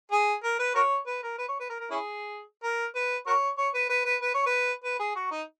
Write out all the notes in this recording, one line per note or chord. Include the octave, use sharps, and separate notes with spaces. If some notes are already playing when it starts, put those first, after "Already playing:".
G#4
A#4
B4
F#4 A#4 C#5
B4
A#4
B4
C#5
B4
A#4
A#4
C#4 E4 G#4
A#4
B4
F#4 A#4 C#5
C#5
B4
B4
B4
B4
C#5
B4
B4
G#4
F#4
D#4